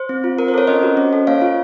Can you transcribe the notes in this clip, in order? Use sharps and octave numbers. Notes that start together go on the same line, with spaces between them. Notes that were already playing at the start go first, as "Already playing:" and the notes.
Already playing: C5
C4
F4
C4 A#4
C5
A4 A#4 C#5
C#4 C5 D#5
F#4
C#4
A4
A#3 C#5 F5
F4